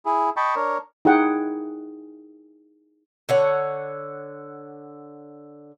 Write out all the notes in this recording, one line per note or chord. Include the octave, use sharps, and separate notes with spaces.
E4 G#4
D#5 G5 A5 B5 C#6
D4 A#4 C#5
D#4 E4 G#4 F#5 G5
D3 C#5 F#5